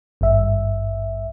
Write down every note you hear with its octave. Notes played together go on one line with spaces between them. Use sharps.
G#1 G2 E5